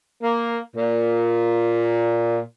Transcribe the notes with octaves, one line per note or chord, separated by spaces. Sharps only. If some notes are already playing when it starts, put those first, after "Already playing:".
A#3
A#2